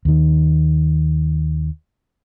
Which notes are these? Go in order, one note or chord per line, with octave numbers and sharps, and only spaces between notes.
D#2 D#3